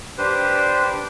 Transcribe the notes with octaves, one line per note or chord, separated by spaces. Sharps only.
D4 G4 B4 C5